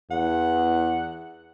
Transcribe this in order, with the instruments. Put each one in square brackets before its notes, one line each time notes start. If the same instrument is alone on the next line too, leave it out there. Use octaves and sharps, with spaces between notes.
[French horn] E2 [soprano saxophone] F#5